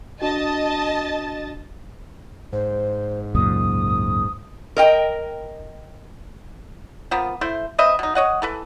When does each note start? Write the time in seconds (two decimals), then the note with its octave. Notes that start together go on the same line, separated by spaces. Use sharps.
0.22 D4 F#4 D#5 A5 A6
2.53 G#2 C5
3.35 C#2 F#2 A#2 D#6
4.76 A#4 D#5 G5
7.11 F3 A#3 B3
7.41 A3 E4 C5
7.78 C4 B4 D#5 E5
7.99 B2 D#4
8.15 C#5 D#5 F#5
8.42 E3 A4 B4